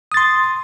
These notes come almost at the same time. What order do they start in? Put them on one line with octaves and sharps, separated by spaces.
D#6 A6 C6